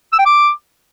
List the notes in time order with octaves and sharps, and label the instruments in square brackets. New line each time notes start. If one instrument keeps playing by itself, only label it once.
[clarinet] E6
G5
D6